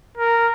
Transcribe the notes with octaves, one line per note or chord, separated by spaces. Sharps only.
A#4